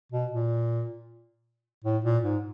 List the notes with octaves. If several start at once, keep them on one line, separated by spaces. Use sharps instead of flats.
B2
A#2
A2
A#2
G#2